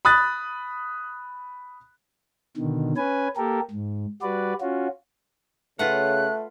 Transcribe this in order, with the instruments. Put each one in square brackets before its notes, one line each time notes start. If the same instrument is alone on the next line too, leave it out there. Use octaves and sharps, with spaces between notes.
[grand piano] B5 D#6 F#6 A6
[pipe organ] B2 D3 D#3
C#4 B4 G#5
A#3 G4 A4 A#4
G#2
G3 F#4 B4 D5
C#4 F4 F#4
[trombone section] C#3 [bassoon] A3 [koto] F4 B4 F#5 [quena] F#6